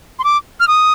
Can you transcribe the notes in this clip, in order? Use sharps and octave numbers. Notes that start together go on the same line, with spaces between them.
C6
D6
F6
D#6